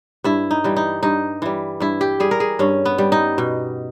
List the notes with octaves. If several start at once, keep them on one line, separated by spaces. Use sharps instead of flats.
G2 E4
D#4
E3 G3
D#4
G2 D#4
E3 G3
G2 E4
G4
G3 G#4
A#4
G#4
G2 C#4
B3
G3
D#4
B2